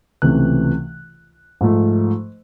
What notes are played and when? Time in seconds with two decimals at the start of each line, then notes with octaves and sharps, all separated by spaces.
0.22 C#2 C3 E3 A3 F#6
1.61 G#2 F3 A3